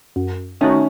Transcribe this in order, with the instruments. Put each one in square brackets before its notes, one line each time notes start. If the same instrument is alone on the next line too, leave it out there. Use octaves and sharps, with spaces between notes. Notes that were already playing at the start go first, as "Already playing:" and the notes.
[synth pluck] F#2
[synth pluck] D#3 A3 D#4 F#4 [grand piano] C#4